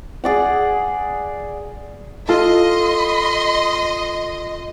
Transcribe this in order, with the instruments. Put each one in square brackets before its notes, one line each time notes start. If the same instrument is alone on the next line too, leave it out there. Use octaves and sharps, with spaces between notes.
[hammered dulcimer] G#4 D5 F#5
[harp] F4 A4 [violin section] D#5 [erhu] C6